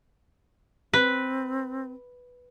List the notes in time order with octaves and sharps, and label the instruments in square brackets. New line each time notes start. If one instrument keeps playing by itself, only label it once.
[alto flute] C4 [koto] B4